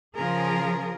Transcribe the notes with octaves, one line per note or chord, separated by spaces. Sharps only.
C#3 F3 F4 G#4 A#4